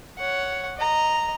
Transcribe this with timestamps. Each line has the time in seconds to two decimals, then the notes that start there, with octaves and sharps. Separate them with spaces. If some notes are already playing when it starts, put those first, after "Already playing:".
0.18 C#5 F#5
0.77 D#5 A#5